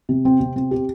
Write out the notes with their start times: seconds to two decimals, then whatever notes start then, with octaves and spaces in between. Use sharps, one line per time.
0.09 C3
0.25 C4
0.40 C3
0.56 C4
0.71 G4